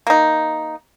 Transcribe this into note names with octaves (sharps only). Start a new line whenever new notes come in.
A#3 D#4